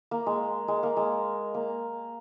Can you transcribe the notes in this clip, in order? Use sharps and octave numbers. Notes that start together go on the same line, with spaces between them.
A#3
G#3
G#3
A#3
G#3
A#3